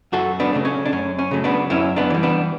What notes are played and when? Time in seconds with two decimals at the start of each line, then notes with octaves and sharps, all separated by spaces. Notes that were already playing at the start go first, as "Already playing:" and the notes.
0.12 F#2 F#4 A4
0.40 B3 D4
0.53 C#3 F#3 A3
0.65 C#4
0.86 D4
0.92 F#2 C#4
1.19 C#4
1.31 C#3 F#3 A3
1.44 B3 D4
1.70 F#2 C#4 E4
1.96 B3 D4
2.10 E3 G3
2.23 B3 D4